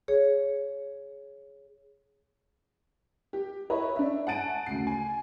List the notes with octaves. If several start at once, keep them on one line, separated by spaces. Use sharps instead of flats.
G#4 C#5
G4
E4 B4 C#5 D#5 E5
D4 E5
F#5 G#5 A5 A6 D7 D#7
D2 C#3 C7
G#5